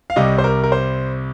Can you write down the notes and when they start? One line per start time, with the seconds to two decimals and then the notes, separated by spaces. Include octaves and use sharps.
0.10 F5
0.16 C2 C3 G3 D#5
0.38 C5
0.44 A#4
0.64 A#4
0.72 C5